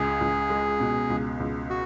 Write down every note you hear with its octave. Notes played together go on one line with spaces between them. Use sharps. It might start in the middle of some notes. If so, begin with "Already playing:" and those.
Already playing: C#2 G#4
C#2
G#3
B2
C#2
C#2
F#4